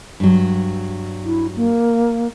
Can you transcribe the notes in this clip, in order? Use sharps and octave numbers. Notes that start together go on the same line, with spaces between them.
G2 F#3
E4
A#3